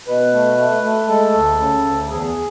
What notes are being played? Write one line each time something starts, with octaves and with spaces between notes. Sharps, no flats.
B2 B4
A3
A3
A3
G#3 A4
D2
C#3
D2
E2 G#4